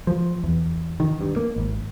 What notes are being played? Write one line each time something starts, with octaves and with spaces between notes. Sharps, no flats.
F3
E2
D#3
G2
A#3
G#1